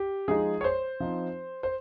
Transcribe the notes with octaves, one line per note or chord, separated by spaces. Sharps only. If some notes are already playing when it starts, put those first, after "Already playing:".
Already playing: G4
F3 G#3 D#4 G#4
C#5
C5
F3 C4 D#4
C5